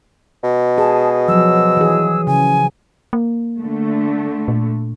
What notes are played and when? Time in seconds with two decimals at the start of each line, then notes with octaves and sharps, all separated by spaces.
0.44 B2
0.78 G#4 A5
1.28 F3 F#3 E6
1.77 E3 G#4
2.27 C#3 G#5
3.13 A#3
3.60 D3 A3
4.48 A#2